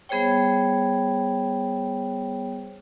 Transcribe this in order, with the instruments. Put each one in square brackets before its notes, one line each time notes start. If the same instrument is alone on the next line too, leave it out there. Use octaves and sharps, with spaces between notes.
[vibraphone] G3 B3 G#4 C5 C#5 G5